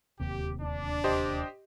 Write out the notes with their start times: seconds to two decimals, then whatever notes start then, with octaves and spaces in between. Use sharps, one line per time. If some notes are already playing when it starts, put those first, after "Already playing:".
0.20 D1 D#2 C3 G4
0.62 D4
1.04 G4 C5 D#5